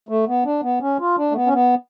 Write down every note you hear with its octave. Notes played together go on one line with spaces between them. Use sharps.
A3
B3
D4
B3
C#4
F4
D4
A3
B3
C#4
B3